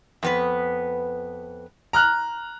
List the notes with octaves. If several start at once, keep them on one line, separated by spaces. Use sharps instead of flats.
F2 B3 B4
A#5 F6 F#6